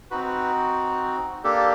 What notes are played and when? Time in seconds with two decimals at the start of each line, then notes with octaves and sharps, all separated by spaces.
0.11 C4 D#4 F#4 B4
1.44 A#3 D4 G4 A4